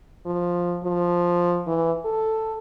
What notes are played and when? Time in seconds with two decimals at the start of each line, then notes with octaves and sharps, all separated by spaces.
0.26 F3
0.84 F3
1.67 E3
2.05 A4